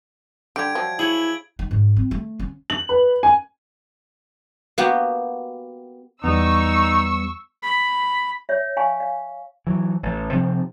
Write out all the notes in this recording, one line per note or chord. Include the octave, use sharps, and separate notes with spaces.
D3 G3 G4 G#6 D7
F3 F#3
E4 G#4 C#5 F#7
D#4
G#2
C4
A3
C#4
F#7
B4
G#5
A#3 B3 F#4 G4
E2 G3 B3 D#4 C#6 E6
B5
C#5 E5
F5 G#5 C#6
F5
E3 F#3
A1
C3 F3 C4